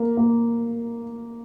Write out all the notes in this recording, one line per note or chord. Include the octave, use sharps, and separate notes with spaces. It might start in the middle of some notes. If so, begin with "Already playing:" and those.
Already playing: A#3
A#3